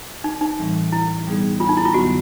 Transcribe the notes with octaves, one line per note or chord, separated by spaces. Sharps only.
D#4
D#4
A2 E3 G3 C4
E4
B2 G3 B3 D#4 G#4
F4
D#4
E4
F4
F2 D3 F#3 B3 F#4